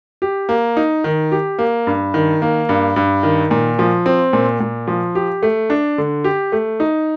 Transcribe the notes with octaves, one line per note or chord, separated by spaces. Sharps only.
G4
A#3
D#4
D#3
G4
A#3
G2
D#3
A#3
G2
G2
D#3
A#2
F3
C4
A#2
A#2
F3
G4
A3
D4
D3
G4
A3
D#4